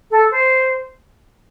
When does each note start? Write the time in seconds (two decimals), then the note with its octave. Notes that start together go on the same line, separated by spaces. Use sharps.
0.11 A4
0.31 C5